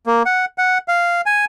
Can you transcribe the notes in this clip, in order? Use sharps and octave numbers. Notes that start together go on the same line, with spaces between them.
A#3
F#5
F#5
F5
G#5